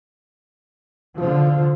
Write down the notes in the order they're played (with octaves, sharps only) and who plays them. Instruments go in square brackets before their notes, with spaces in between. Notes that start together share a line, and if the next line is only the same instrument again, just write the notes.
[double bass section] D3 F3 [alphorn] F4